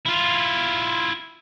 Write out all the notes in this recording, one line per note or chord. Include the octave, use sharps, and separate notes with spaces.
E4 F4